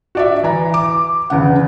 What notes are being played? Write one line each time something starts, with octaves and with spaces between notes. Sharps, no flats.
F#4 D5 E5
E3 A#5
D6
E2 C#3 F#5